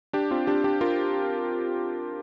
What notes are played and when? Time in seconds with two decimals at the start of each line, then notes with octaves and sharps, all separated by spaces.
0.13 D4 G4
0.31 C4 F4
0.47 D4 G4
0.64 D4 G4
0.81 F4 A#4